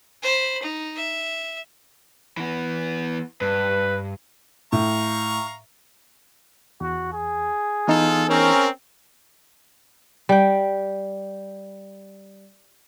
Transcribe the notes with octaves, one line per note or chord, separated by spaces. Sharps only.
C5 B5
D#4
E5
E3 B3
G2 B4
A2 F5 A#5 C#6
E2 F#4
G#4
E3 B3 D#4 F4 A4
C4 C#4 A#4
G3 G5